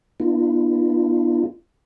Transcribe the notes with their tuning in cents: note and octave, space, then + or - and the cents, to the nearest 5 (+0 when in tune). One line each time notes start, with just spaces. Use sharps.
B3 -25 D4 +45 F4 -45